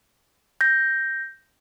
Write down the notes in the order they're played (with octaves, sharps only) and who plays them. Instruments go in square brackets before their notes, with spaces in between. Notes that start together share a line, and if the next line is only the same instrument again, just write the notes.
[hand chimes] G6 A#6